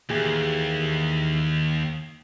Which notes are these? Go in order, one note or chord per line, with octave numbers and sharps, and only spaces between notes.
D#2 E3 G4 G#4